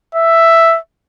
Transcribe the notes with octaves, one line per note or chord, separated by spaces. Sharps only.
E5